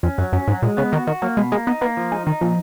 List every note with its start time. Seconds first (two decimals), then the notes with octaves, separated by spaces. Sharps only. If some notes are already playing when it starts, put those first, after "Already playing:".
0.03 F2 C#4
0.18 F#2 F#3
0.33 F#2 C#4
0.48 G#2 F#3
0.62 A#2 G#3
0.77 C#3 B3
0.92 D#3 F#4
1.07 D#3 F#4
1.22 F#3 A#3
1.37 B2 G#3
1.52 G#3 A#3
1.67 B3 D#4
1.81 A#3 B3
1.97 F3
2.12 G#3 D#4
2.27 D#3 D#4
2.41 A#2 F3